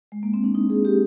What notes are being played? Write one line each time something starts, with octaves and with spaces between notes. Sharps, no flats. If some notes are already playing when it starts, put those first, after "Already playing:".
G#3
A#3
C4
D4
D#4
G#4
G4